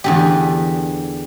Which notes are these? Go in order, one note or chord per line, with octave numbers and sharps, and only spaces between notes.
E2 D3 G4